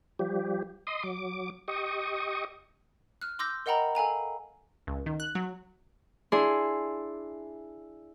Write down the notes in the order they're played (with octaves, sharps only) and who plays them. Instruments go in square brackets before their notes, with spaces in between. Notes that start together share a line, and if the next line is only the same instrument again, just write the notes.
[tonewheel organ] F3 G3 G4
D#5 C6 D#6
F#3 D6
G4 D#5 C#6 D#6
[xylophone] F6 F#6
C6 D6 E6 G6 A#6
A#4 D#5 F#5 G5 A#5 B5
A4 F5 G#5 A#5
[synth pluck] C#2
D#3
F#6
F#3
[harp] D4 E4 G#4 C6